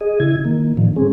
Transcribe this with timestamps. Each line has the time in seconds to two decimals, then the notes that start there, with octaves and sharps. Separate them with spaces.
0.01 G#4 D#5
0.20 C#3 E4 G#6
0.45 D#3 A#3
0.77 A2 D3 D#3 F3
0.96 G#3 C4 C#4 G#4